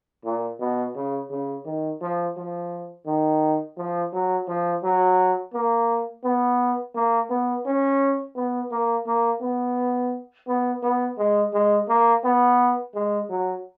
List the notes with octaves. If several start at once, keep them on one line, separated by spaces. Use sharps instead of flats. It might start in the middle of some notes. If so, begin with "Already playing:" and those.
A#2
B2
C#3
C#3
D#3
F3
F3
D#3
F3
F#3
F3
F#3
A#3
B3
A#3
B3
C#4
B3
A#3
A#3
B3
B3
B3
G#3
G#3
A#3
B3
G#3
F#3